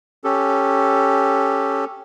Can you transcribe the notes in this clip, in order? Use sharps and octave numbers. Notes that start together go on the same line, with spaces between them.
C#4 G4 A4